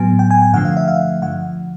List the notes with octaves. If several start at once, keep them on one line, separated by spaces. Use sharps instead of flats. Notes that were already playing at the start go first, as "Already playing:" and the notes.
Already playing: A2 F#3 B3 G#5
G5
G#5
G5
G2 D3 F3 A3 F#5
F5
E5
F5
D3 F3 F#5